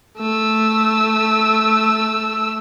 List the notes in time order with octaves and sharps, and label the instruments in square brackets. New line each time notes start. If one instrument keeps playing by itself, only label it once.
[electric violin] A3 E6